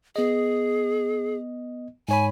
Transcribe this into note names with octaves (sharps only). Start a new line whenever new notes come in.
B3 G#4 D#5
G#2 C#5 G#5 B5